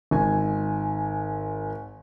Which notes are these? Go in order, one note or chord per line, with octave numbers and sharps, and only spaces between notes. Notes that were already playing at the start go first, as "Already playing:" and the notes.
G#1 G#5